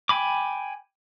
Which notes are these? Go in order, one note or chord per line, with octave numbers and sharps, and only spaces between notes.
G5 G#5 B5 D6